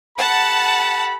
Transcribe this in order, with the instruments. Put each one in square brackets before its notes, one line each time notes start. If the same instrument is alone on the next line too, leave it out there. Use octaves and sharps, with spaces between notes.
[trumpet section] G4 A4 B5 [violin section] F#5 A5